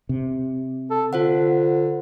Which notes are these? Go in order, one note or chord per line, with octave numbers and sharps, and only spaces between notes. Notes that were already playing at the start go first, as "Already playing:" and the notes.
C3
A4
D3 F4 C5 F#5